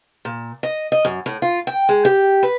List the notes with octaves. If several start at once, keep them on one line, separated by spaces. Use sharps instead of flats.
A#2
D#5
D#5
F#2
A2
F4
G5
G#3
G4
B4